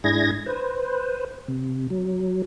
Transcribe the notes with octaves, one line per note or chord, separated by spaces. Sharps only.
G#2 D4 E4 G#4 G#6 A#6
B4 C5
C3
F#3